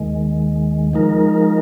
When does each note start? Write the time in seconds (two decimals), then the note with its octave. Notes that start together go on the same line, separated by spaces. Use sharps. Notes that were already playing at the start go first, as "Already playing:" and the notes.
Already playing: D#2 D#3 G#3
0.93 F3 G#3 D#4 A#4